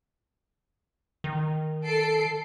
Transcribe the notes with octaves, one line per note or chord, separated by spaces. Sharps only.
D#3
A4 C7 D7